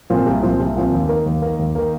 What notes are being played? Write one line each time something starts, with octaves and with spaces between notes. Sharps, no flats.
A#2 F3 C4
C2
A#2 F3 C4
C2
A#2 F3 C4
D#2
D#3 A#3
D#2
D#3 A#3
D#2
D#3 A#3